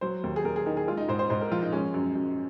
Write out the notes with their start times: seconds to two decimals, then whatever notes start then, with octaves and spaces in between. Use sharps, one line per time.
0.01 F#3 C5
0.24 D#2
0.36 G#4
0.45 D#2 A#4
0.56 G#4
0.66 D#3 G#4
0.77 G#4
0.88 G#3 F4
0.97 D#4
1.09 G#2 C5
1.19 C5
1.30 G#2 C5
1.41 A#4
1.52 F3 F4
1.62 D#4
1.73 G#3 C#4
1.94 F#2
2.15 F#2